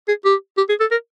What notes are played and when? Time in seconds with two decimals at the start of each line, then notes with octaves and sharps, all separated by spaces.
0.08 G#4
0.25 G4
0.57 G4
0.69 G#4
0.81 A4
0.91 A#4